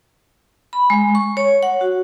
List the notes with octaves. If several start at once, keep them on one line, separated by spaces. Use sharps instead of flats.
B5
G#3
C#6
C#5
F#5
F#4